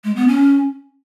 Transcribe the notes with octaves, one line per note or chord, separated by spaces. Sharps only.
G#3
B3
C#4